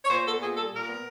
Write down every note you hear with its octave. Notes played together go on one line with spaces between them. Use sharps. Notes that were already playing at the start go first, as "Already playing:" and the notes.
C#5
A#2 C5
B3 A4
A#2 G#4
G3 A4
A#2 A#4
B3